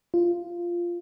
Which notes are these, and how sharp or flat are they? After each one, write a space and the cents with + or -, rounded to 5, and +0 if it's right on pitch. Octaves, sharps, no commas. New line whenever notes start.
F4 -10